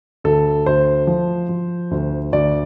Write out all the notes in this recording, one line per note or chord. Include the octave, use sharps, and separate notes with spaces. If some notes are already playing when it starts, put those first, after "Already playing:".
D2 A4
D2 C5
F3
F3
D2
D2 D5